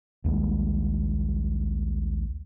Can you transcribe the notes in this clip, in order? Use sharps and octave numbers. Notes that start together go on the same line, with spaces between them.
A#1 D#2 G3 G#3